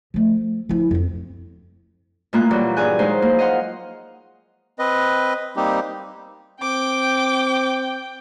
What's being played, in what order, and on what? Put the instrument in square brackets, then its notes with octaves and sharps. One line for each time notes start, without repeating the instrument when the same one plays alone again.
[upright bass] F3 A3
F3 E4
F2 C4
[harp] A2 G#3 A#3 F4 F#6
A#2 E3 F#3 G3 A#3
G2 G#4 G#5 F#6
F3 F#3 G#3 D#4 C5
A#3
D#5 F5 F#5 C6
[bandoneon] C4 B4 D#5
G3 A#3 C4 D#4 G4
[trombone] C4 [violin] G5 [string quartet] D6